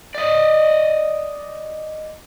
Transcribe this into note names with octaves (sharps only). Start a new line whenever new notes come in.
D5 D#5